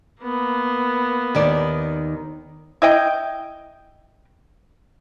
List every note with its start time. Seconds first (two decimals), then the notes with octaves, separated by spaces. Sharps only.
0.22 A#3 B3
1.35 D#2 D#3 D5
2.82 E4 D#5 G5